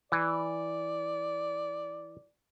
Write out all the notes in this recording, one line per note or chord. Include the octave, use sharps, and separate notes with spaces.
E3 D5